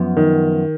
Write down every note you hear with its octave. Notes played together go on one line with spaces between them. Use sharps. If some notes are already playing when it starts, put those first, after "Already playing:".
Already playing: F#2 F3 B3
D#3